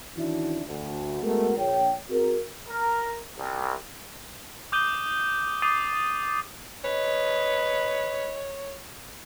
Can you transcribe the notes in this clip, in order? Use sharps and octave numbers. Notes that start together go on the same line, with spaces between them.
D#3 E3 C#4 D4 E4 F#4
D2
G#3 A3 B3 F#4 A#4
A#1 C#5 G5
C4 F#4 G#4 A#4
A#4
C2
D6 D#6 G6 D#7 G7
D6 D#6 G6 A6 C7 D#7
B4 C#5 D#5